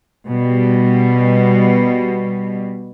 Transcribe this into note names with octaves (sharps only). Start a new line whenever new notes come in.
B2 G3